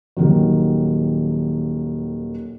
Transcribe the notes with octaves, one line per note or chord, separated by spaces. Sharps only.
D#1 D#3 F#3